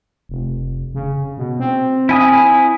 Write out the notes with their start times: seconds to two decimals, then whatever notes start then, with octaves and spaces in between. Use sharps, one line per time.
0.29 F1
0.94 C#3
1.37 B2
1.59 C4
2.09 E4 G#5 D#6